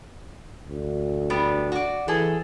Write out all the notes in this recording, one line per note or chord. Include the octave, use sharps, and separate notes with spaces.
D2
G3 B3 D4
F#4 D5
E3 G#4 A4